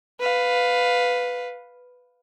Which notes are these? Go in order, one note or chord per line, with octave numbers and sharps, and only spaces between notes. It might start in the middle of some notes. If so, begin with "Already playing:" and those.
B4 F5